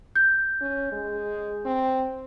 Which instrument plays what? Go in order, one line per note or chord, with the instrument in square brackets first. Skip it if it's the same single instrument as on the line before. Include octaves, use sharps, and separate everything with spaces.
[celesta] G6
[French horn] C#4
G#3
C4